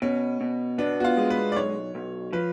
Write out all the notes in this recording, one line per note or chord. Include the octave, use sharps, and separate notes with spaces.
B2 C#4
B2
B3 D4
F#4
F4
G#3
B4
D5
B1 C#5
B1
F3 B4